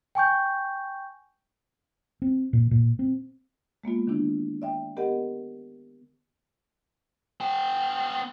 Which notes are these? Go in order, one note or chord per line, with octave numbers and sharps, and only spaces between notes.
G5 G#5 C#6 G6
C4
A#2
A#2
C4
G#3 A#3 B3 F4
D3 D#3 B3 D4 E4
D5 E5 G5
B3 G4 A#4 D5 D#5 F#5
B3 G5